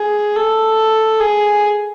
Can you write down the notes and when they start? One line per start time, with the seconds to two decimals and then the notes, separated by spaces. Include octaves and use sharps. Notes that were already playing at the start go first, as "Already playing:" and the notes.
Already playing: G#4
0.36 A4
1.20 G#4